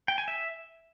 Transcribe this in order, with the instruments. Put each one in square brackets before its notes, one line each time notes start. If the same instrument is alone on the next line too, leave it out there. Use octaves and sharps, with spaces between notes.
[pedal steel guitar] G5
G#5
E5